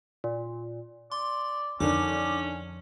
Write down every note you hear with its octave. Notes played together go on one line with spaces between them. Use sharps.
A#2
D5 C6
F2 D3 D#3 C#4 D4 D6